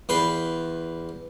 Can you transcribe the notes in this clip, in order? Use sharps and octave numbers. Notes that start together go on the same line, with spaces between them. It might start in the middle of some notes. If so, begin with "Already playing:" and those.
E2 B4 G5 C6